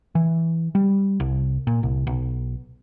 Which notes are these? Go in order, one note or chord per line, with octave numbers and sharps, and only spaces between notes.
E3
G3
C2
A#2
C2
B1